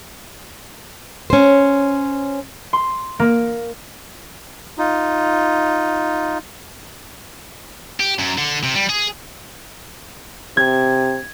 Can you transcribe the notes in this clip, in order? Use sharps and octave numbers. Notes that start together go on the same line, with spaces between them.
C#4 C5
C6
A#3
D#4 F4
G4
F#2
D3
C3
G3
G#4
C3 G#6